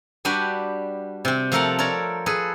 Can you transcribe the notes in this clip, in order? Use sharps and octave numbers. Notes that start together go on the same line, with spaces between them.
G3 D4 F#4 G4 B4
C3 C4
F3 A3 A4 A#4 F5 F#5
A4 A#4 C#5 D5 A#5
G#4 A4 B4